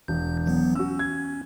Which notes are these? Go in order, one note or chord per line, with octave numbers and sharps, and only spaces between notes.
E1 G6
E3 F#3 B3
C#4 F#4 E6
G#6